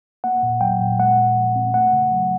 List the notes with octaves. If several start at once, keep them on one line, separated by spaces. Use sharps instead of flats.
A#3 F#5
A#2
F#3 G5
A#2
G#3 F#5
A#2
F3
C4
A3 F#5
C#3
F#3